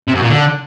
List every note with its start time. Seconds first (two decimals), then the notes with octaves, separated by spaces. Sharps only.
0.08 C3
0.15 F#2
0.22 A#2
0.29 D3